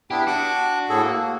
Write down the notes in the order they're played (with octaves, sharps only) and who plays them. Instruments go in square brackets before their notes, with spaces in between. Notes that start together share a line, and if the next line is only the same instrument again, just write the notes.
[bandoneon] B3 D4 E4 [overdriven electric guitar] G4
[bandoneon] D4 D6 [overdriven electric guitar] F#4
[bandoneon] A2 G#4 A4
A#3